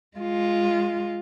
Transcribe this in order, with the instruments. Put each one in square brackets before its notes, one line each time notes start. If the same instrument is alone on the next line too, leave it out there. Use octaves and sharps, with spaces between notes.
[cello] G#3 F4